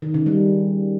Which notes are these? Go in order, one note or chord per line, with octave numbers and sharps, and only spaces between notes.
D#3
C#3
G3